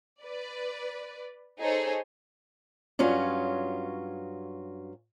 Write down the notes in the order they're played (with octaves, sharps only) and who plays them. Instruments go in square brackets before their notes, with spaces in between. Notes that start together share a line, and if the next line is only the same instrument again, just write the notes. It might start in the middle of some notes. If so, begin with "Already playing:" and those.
[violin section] B4 D5
D#4 G#4 A4 C5 C#5
[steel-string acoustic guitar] G2 F#3 C#4 F4